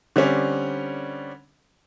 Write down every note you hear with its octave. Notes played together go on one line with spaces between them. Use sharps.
D3 G3 C4 C#4